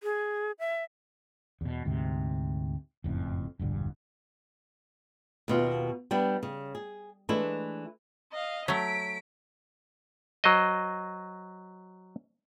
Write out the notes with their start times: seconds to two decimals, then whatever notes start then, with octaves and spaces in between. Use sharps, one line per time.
0.03 G#4
0.59 E5
1.61 E2 B2
1.85 D2 G#2 C3
3.04 F#1 F2 A2
3.59 E1 A#1 G2 D3
5.48 D#2 B2 F4
6.11 G3 B3 D4 E4
6.43 C#3
6.75 G#4
7.29 E3 G#3 A3 D4 E4
8.32 D#5 F5
8.68 F#3 A3 B6 D7
10.44 F#3 C5 D#5